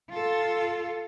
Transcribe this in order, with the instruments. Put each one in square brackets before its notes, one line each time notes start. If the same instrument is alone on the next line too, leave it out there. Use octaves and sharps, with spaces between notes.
[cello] F4 A4